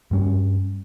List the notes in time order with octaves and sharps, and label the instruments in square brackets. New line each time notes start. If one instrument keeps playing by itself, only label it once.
[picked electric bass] G2 G3 C#4